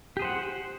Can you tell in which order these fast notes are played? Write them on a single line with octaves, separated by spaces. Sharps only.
G4 G#4 C5 F#5